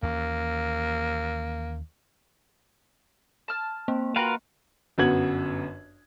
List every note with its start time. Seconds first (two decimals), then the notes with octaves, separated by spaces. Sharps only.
0.03 D#2 E3 A#3 C#4
3.48 A5 F6
3.88 A#3 C4
4.16 F4 F#4 A#4 B4 F5 G5
4.98 G1 F#2 B3 F#4 G#6 F#7